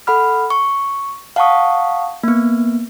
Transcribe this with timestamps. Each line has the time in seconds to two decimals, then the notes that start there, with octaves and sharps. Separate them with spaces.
0.07 A4 F#5 B5 F6
0.50 C#6
1.36 F5 F#5 A5 A#5 C#6 D#6
2.24 A#3 B3